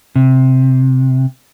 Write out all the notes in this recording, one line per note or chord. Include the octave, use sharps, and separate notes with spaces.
C3